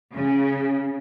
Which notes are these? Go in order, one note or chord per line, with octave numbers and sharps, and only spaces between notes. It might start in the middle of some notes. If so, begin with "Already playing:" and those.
C#3